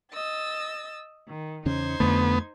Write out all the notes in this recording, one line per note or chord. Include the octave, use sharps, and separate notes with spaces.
D#5 E6 A6
D#3
E2 C#3 C#4 D#4 C5 G#6
F2 D3 A3 B3